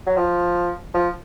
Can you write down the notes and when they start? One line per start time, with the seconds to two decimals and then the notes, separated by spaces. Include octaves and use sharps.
0.07 F#3
0.17 F3
0.94 F3